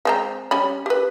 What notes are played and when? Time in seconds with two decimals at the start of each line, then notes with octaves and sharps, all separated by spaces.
0.05 G#3 C4 A#5
0.51 G3 C#4 B5
0.86 G4 B4